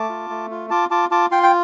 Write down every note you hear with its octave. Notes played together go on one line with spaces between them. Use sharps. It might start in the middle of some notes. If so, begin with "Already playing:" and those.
Already playing: A3 A5 D6
F4
A3
F4
F4 A5 D6
F4 A5 D6
F4 A5 D6
F4 G5 C6
G5